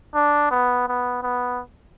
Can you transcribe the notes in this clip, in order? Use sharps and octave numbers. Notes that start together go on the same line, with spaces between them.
D4
B3
B3
B3